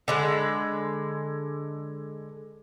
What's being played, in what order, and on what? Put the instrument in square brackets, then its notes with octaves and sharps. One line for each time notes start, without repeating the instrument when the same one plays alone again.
[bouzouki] D3 G#3 B4